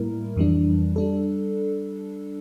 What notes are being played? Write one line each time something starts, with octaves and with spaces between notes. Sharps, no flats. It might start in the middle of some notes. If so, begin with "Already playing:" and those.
Already playing: A2 G3 A#3 E4 A#4
F2 E3 G3 D4
G3 D4 A4